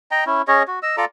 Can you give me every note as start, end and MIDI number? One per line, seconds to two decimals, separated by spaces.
0.11 0.24 75
0.11 0.24 79
0.11 0.24 82
0.26 0.42 61
0.26 0.42 64
0.48 0.63 61
0.48 0.63 68
0.48 0.63 73
0.48 0.63 75
0.68 0.79 66
0.83 0.96 75
0.83 0.96 88
0.97 1.05 65
0.97 1.05 69
0.97 1.05 74
0.97 1.05 82